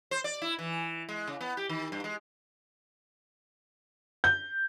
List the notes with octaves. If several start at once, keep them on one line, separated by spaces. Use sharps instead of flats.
C5
D5
E4
E3
G#3
C#3
B3
G4
D#3
G2
G#3
G6